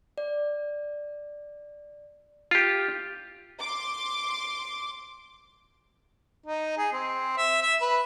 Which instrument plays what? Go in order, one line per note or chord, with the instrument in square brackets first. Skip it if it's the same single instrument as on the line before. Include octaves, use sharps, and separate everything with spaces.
[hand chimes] D5
[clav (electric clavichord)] F4 G4
[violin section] C6 D6
[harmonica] D#4
G#4
C4
E5
E5
B4